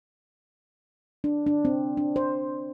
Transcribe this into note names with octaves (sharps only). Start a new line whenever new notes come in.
D4
D4
C4
D4
C5